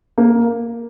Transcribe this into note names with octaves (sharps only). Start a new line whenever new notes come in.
A#3